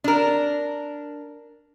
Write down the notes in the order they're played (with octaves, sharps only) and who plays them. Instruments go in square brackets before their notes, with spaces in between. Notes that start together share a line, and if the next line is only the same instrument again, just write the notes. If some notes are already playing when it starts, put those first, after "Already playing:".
[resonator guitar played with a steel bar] D4 A#4